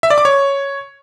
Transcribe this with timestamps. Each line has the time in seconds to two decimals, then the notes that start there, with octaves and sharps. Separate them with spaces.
0.03 E5
0.10 D5
0.18 D6
0.25 C#5